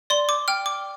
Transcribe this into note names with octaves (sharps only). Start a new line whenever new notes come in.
D5 C6
D6
G5 F6
D6